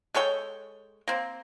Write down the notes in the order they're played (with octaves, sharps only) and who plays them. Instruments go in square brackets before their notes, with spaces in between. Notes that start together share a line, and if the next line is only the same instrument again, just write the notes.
[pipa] G#3 A4 C#5 G5
A#3 C4